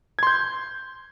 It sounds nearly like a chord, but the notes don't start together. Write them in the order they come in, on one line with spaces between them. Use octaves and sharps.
G#6 C6 G6